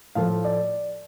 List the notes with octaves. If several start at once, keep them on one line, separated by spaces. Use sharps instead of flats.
A2 F3 A3 F5
D5